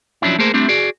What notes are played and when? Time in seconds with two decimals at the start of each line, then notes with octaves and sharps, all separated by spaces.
0.22 F3 F#3 C#4 D4 E4
0.39 A3 A#3 G#4 A#4 C5
0.54 G3 A3 C4 D4 E4
0.68 F#4 G#4 D5